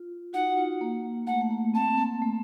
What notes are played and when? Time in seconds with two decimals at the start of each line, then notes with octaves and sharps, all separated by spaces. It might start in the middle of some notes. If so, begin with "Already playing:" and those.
Already playing: F4
0.33 D#4 F#4 F#5
0.57 F4
0.81 A#3
1.27 A3 F#5
1.41 A3
1.51 A#3
1.74 C4 A5
1.98 A#3
2.22 A3